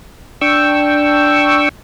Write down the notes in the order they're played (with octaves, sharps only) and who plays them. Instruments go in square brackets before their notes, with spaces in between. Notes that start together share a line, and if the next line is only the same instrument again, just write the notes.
[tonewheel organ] D4 G5 C#6 E6